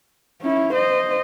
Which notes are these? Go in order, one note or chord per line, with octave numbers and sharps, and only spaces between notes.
C#4 E4
C5 D#5